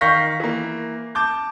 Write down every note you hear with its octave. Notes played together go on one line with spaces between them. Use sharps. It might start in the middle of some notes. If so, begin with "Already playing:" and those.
D#3 F5 C#6 G6 A#6 B6
E3 A#3
A5 D6 G6